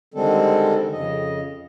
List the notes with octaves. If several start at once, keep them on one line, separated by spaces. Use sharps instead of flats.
D3 D#3 G3 G#3 C4 A4
F2 C#3 D#5